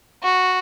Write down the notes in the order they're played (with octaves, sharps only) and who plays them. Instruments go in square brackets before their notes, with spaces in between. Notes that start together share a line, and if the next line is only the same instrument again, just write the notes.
[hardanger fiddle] F#4